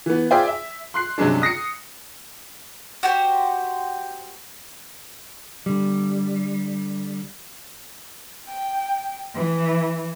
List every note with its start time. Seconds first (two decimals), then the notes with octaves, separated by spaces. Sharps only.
0.06 E3 B3
0.31 F4 G#4 C5 D5 E5 G5
0.48 E5
0.94 C6 F#6 C7
1.18 G2 C3 F#3 G#3 C#4 D4
1.42 D#6 A#6 C7 C#7
3.03 F#4 G4 C5
5.66 D3 G3
8.47 G5
9.35 E3